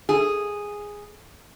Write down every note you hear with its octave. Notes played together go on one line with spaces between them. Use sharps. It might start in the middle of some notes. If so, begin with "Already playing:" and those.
G#4